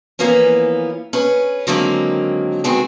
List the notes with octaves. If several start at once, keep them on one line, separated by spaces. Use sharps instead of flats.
E3 F3 A#3 B3 C#4
C#4 G#4 B4
D3 D#3 F#3 G#3 A#3 C4
D#3 G#3 B3 C4 F#4 G#4